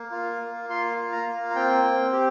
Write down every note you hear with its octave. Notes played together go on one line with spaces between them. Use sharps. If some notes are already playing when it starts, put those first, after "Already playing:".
Already playing: A#3
F4
A#3
F4 C6
F4
A#5
A#3
A#5
C4 G5
C4
G4